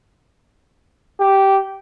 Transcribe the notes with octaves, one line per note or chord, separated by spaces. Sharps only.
G4